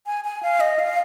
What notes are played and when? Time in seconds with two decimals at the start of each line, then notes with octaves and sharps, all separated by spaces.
0.06 G#5
0.24 G#5
0.43 F5
0.60 D#5
0.79 F5